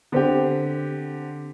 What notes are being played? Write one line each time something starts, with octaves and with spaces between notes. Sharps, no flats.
D3 C4 G4